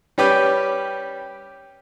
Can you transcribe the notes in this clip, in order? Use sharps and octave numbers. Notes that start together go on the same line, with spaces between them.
G3 C#4 G4 B4 D6